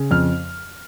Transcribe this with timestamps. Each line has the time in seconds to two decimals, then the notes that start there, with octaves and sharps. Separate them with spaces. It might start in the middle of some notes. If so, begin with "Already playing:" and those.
Already playing: C#3
0.11 F2 F6